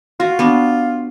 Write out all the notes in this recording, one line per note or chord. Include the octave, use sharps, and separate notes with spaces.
F4 F#4
B3 D4